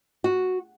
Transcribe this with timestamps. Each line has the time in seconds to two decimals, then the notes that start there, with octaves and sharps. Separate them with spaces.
0.24 F#4